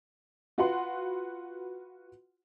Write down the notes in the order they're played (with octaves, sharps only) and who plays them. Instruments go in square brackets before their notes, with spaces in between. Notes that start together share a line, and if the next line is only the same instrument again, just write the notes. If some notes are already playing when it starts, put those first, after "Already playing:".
[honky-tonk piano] F4 F#4 B4 F#5 C6